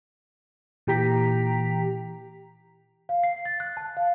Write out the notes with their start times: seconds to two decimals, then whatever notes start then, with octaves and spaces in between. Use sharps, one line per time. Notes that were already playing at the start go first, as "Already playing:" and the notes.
0.87 A#2 E3 G4 G5 A#5 B6
3.09 F5
3.24 C7
3.45 A6
3.60 F#6
3.77 A5
3.97 F5